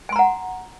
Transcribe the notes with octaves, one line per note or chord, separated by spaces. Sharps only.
F#5 G#5 A#5 C6